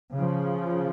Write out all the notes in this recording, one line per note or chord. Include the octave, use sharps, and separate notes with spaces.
C#3 F3